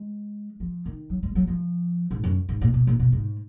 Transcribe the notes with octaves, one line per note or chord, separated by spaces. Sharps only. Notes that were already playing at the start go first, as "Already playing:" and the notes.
Already playing: G#3
F3
D#3
F#3
G#3
F#3
F3
G#2
F#2
G#2
A#2
B2
A#2
B2
G#2